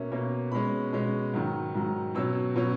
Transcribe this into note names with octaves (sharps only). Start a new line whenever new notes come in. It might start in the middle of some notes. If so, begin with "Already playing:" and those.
Already playing: B2 A#3 C#4 E5
B2 A#3 C#4
B2 G#3 C#4 B5
B2 G#3 C#4
G#2 D#3 F#3
G#2 D#3 F#3
B2 F#3 C#4 E6
B2 F#3 C#4